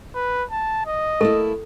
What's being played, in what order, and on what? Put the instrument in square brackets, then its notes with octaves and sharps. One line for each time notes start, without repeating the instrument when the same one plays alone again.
[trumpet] B4
A5
D#5
[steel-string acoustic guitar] A3 A#3 E4 [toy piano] A4